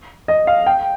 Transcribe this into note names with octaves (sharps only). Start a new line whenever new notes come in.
D#5
F5
G5